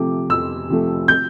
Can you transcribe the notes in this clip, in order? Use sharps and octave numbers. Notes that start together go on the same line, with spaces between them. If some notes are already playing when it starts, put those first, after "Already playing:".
Already playing: C3 F3 A3 D6
F2 E6
C3 F3 A3
G6